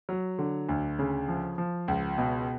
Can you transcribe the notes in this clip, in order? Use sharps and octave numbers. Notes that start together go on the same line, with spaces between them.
F#3
D3
D2
C#3
F3
F3
C#2
B2